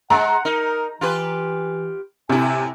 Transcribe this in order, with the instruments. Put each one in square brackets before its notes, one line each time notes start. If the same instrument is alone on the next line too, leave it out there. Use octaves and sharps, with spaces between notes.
[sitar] G#3 [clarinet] F#5 [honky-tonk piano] A#5
[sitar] D#4 [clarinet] A#4
[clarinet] E3 [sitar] F4 G4 B4
[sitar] A2 E4 [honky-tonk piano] C3 [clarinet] G#5